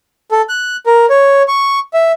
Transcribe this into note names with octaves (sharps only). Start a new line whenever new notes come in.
A4
F#6
A#4
C#5
C#6
E5